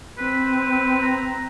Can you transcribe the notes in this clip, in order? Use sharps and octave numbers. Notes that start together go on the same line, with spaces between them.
C4 B4
A#5